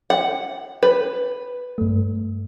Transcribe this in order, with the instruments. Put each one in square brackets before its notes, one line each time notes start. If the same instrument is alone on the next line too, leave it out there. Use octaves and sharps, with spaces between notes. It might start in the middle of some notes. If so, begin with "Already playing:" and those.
[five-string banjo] F#5
B4
[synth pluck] G2 A3